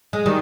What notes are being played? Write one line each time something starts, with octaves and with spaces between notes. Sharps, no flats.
G#3
D#3 G3